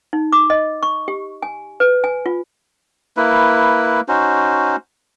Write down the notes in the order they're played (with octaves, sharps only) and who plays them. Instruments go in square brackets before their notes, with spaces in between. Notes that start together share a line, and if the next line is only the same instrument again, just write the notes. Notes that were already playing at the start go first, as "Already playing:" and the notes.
[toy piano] D#4
D6
D#5
C#6
G4
G#5
B4
G#5
F4
[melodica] A#3 E4 B4
C#4 D#4 F#4 C5